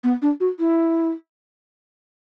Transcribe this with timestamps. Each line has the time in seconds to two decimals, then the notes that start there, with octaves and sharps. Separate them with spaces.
0.04 B3
0.22 D4
0.40 F#4
0.59 E4